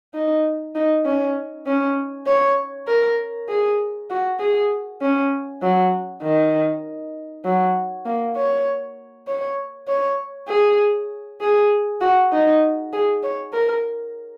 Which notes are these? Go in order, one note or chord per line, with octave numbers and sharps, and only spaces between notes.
D#4
D#4
C#4
C#4
C#5
A#4
G#4
F#4
G#4
C#4
F#3
D#3
F#3
A#3
C#5
C#5
C#5
G#4
G#4
F#4
D#4
G#4
C#5
A#4